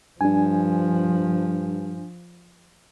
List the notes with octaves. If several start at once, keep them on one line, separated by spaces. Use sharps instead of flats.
G2 F3 D4 G#5